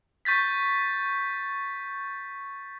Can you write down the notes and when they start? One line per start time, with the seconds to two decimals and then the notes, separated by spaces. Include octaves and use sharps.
0.25 C#6 G6 A6 B6